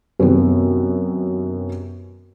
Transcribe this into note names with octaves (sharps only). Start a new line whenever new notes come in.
F#2 C3 D#3 B3